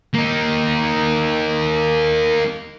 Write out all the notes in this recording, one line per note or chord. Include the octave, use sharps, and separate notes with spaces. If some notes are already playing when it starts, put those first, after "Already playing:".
A#3 D#4